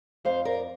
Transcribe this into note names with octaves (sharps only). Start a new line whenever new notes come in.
F2 C5 F5
A#4 D5